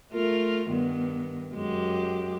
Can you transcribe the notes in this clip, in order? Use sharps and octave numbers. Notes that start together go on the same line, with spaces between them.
A3 F4 A#4
G2 D#3 B3
F#2 G#3 G4